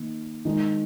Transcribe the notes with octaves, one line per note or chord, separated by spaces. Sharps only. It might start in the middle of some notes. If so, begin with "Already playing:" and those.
Already playing: D#3 A#3
D#3 G#3 D#4